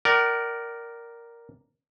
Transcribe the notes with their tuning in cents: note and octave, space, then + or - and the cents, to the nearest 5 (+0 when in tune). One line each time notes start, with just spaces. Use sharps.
A#4 +0 D5 +0 F#5 +45